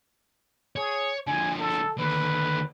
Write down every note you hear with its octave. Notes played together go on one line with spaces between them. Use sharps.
G#4 C#5
D3 F3 G#5
A4
D#2 D3 B4